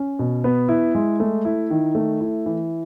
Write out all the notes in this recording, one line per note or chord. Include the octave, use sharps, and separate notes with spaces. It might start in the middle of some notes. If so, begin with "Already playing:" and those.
Already playing: C#4
B2
B3
E4
G#3
A3
E4
D#3
A3
E4
E3